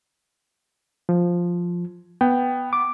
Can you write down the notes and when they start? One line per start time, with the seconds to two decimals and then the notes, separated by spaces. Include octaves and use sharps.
1.09 F3
2.21 B3 G5
2.73 D6